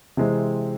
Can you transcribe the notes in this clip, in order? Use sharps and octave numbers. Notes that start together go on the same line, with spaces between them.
C3 E3 G#3 C4